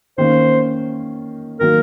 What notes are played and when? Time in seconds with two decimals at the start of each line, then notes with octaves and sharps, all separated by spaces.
0.18 D#3 A#3 C#4 C5
1.60 D#3 F#3 A#3 A#4